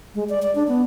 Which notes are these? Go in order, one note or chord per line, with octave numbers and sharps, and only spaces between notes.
G#3
D5
D5
D4
B3